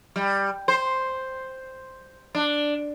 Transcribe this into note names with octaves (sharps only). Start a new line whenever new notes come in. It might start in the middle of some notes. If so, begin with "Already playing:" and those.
G3
C5
D4